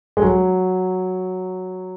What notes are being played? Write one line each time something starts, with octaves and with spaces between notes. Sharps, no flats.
G#3
F#3